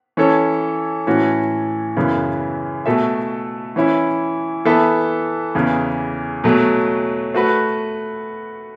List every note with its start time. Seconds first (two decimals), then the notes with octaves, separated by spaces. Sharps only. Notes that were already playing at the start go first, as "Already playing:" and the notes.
0.17 E3 C#4 A4 C#5
1.07 A2 E3 C#4 F#4
1.97 F#2 C#3 E3 B3
2.86 B2 A3 F#4 A4 E5
3.76 E3 C#4 E4
4.65 E3 B3 A4 E5
5.55 E2 C#3 E3
6.44 B2 F#3 A3
7.34 A3 F#4 B4